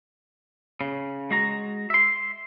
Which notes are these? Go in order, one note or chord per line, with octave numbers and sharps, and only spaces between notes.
C#3
G#3 F#4 A#5
E5 C6